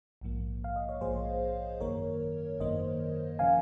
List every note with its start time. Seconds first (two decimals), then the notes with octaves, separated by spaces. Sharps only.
0.21 A#1 G#2 F3 A#3
0.64 F5
0.76 D#5
0.89 C#5
1.01 A#1 G#2 F3 A#3 G#4 C5
1.81 G#1 F#2 D#3 A#3 A#4 C#5
2.60 G#1 F#2 D#3 A#3 C5 D#5
3.39 C#3 F3 F5 G#5